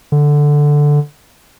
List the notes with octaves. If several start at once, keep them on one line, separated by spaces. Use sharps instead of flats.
D3